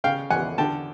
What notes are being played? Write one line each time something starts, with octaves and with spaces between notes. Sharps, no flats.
C#3 F5 G5
E2 F#5 G#5
D3 G5 A5